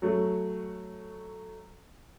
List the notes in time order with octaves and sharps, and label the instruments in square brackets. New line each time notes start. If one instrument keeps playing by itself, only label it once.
[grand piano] F#3 A3